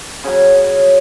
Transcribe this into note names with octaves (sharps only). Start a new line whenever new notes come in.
C#3 F#3